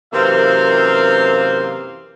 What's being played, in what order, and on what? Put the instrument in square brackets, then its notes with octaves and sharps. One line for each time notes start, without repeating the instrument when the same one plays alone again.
[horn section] F#2 C3 E3 A#3 C4 F5